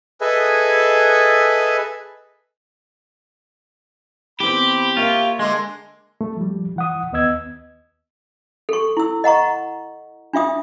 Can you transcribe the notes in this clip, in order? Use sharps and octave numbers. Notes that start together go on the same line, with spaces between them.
G#4 A4 B4 D#5 E5 G#5
E3 B3 C4 G4 B5
A#3 F4 C#5 E5
D3 G#3 C6
A3
F3 G3
E3 F#5 D#6
D#2 B3 D#5 E6 G#6
A4 C#6
E4 E6
D#5 F#5 A#5 C#6
D4 F4 E5 D#6